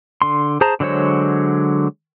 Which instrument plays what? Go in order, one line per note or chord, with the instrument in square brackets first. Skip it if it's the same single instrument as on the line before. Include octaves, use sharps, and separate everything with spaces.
[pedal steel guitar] D3 C6
G#4 C5 A5 A#5
D3 F#3 G#3 C5 C#5